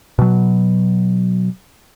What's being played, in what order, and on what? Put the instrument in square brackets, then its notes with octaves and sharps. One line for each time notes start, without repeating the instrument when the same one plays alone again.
[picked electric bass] B2 F#3